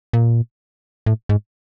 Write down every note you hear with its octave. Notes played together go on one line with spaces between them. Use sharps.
A#2
A2
G#2